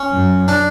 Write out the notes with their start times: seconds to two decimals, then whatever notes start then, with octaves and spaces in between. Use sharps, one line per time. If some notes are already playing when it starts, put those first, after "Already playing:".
Already playing: C#4
0.13 F#2
0.48 D4